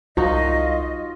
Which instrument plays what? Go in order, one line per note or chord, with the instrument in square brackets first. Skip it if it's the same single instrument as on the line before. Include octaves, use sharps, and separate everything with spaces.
[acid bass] C2 [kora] D#4 F#4 [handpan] F4 [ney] D#5